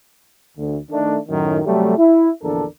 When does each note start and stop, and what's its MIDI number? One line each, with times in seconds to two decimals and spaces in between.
0.58 0.78 38
0.91 1.17 51
0.91 1.17 57
0.91 1.17 62
1.29 1.59 42
1.29 1.59 45
1.29 1.59 51
1.65 1.95 48
1.65 1.95 54
1.65 1.95 55
1.65 1.95 57
1.98 2.30 64
2.42 2.65 34
2.42 2.65 40
2.42 2.65 50
2.42 2.65 62
2.42 2.65 69
2.42 2.65 70